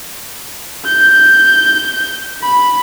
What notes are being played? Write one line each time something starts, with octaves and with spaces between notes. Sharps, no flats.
G6
B5